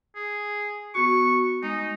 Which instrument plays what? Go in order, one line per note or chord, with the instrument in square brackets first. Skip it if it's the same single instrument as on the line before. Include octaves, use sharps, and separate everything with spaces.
[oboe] G#4
[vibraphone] B3 F#4 [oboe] C#6
[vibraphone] G#3 [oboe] D#4